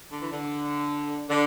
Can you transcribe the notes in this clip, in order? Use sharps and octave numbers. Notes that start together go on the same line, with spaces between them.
D3
E3
D3
D3